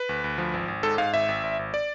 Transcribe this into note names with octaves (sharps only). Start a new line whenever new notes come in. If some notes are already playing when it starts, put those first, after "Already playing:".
Already playing: B4
D2
D2
F3
G#1
G#1
G#2 A4
G#2 F5
G#1 E5
G#1
G#1
G#1
D5